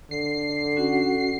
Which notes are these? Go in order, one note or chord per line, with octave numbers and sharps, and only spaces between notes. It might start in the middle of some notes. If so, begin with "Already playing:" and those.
D3 C7
C#4 F#4 F#5